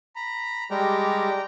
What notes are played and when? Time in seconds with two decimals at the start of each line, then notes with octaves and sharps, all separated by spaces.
0.16 A#5 B5
0.71 G3 G#3 G4 G5 A#5